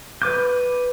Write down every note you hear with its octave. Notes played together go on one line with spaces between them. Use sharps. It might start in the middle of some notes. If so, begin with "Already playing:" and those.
B4 D6 G6